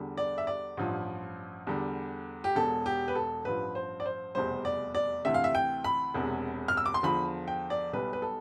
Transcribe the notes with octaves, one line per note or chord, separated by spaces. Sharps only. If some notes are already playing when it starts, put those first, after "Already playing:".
Already playing: E2 D3 G3
D5
E5
D5
A1 G2 F3
E2 D3 G3
G4
E1 E2 B2 A4
G4
B4
A4
A1 G2 F3 B4
C5
D5
C5
F1 E2 B2 G3 C5
D5
D5
D2 C3 E3 E5
F5
E5
G5
B5
E1 E2 C3
F6
E6
D6
C6
E2 D3 F3 B5
G5
D5
B1 B2 G3 B4
B4
A4